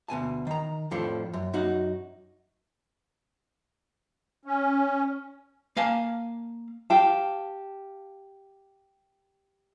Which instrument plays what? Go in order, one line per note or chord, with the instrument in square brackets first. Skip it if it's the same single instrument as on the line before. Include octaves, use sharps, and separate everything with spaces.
[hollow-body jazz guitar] D2 B2 G#5 A5
D#3 A#5
F2 A2 F3 D4 A4
F#2
F#2 D#4 F#4
[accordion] C#4
[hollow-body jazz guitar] A#3 F5 G#5 A5
[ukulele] G4 F5 A5